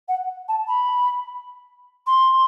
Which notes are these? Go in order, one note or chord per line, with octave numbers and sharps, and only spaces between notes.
F#5
A5
B5
C6